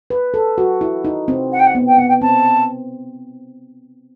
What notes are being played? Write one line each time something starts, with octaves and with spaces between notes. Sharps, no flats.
B4
A4
F#4
E4
D#4
C4
F#5
G5
F#5
B3
G5
B3 F#5
G5
C4 A5